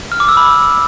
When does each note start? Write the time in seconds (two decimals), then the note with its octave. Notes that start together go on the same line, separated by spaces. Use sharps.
0.12 F6
0.20 D6
0.29 E6
0.37 B5